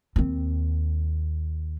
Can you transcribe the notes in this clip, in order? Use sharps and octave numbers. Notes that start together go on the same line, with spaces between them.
D#2 C4